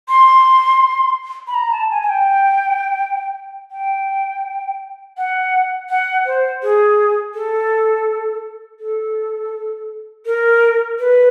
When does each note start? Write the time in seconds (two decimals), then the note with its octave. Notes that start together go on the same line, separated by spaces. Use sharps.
0.09 C6
1.47 B5
1.54 A#5
1.72 A5
1.91 G#5
2.02 G#5
2.09 G5
3.71 G5
5.17 F#5
5.90 F#5
6.26 C5
6.63 G#4
7.35 A4
8.80 A4
10.26 A#4
10.99 B4